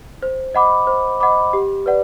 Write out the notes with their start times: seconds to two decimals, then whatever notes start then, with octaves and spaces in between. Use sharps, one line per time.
0.23 C5
0.54 D#5 F#5 B5 D6
0.87 C5
1.20 D#5 F#5 B5 D6
1.53 G4
1.86 B4 D5 F#5